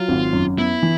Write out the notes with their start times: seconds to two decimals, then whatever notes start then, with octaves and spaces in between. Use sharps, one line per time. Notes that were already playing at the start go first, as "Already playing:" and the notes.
Already playing: F#3 F4
0.08 G#1
0.33 F#2
0.58 B3 E4
0.82 E3